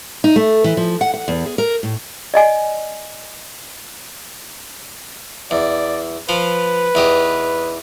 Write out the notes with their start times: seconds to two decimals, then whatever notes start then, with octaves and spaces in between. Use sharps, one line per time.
0.24 D#4
0.36 A3
0.64 E3
0.77 F3
1.01 F#5
1.14 F#5
1.28 E2
1.46 G#4
1.58 A#4
1.83 A2
2.34 D5 D#5 G#5
5.51 E2 D5
6.29 F3 F4 B4
6.95 E2 D#4 G4